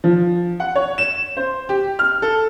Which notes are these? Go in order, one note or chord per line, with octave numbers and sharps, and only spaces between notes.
F3
F#5
C#5
E7
C5
G4
F6
A4